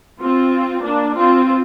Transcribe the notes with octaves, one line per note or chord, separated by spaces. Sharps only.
C4 F4
A#3 D4
C4 F4